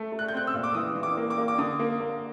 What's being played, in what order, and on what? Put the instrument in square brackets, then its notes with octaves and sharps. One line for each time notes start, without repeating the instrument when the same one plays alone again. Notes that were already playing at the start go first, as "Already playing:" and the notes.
Already playing: [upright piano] A3
A3
F#6
G6
C4 F#6
E6
A#2
D6
E3 D#6
E3
D6
A#3
D6
A#3
D6
D3 D#6
A#3
A#3